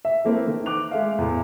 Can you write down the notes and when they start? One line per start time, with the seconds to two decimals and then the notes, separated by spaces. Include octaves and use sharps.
0.05 E5
0.24 E3 A3 A#3 C4 A4
0.47 D#3
0.66 D6 F#6 F7
0.91 G#3 A3 E5 F5
1.18 E2 A2